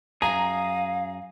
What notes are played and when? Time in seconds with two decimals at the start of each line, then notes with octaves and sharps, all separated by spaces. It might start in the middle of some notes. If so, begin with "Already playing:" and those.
0.22 F#2 G#4 F5 A#5